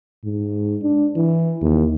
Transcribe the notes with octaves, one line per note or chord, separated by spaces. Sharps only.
G#2
D4
E3
D#2